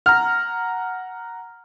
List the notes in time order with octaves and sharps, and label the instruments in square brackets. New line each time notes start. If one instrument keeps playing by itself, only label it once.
[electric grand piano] F#5 A#5 [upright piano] F6